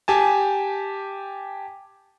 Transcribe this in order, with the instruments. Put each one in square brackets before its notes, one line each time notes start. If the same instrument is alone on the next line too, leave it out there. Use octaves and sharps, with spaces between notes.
[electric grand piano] G4 G#5 A5